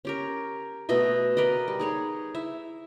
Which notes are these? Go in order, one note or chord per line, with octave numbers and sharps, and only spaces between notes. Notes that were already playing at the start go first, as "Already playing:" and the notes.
C#4 G4 A#4
B2 A3 D#5 E5
A#4 B4 D5 D#5
G3
D#4 G#4 C#5
E4 E5